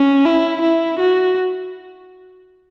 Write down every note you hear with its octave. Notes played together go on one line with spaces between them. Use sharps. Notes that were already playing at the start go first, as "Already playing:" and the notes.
Already playing: C#4
E4
E4
F#4